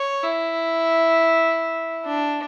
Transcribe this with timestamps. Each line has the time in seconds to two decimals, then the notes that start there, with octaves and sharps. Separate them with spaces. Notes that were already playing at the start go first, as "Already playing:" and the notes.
Already playing: C#5
0.24 E4
2.05 D4